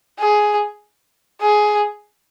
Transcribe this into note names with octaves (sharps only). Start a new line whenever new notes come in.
G#4
G#4